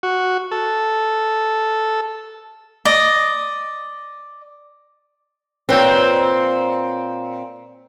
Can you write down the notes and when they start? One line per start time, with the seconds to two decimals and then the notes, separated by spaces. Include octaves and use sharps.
0.03 F#4
0.51 A4
2.85 D5 D#5
5.69 A#2 C4 B4 C#5 G5